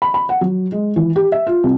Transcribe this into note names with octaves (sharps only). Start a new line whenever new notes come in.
B5
B5
F#5
F#3
G#3
E3
G4
E5
F4
C2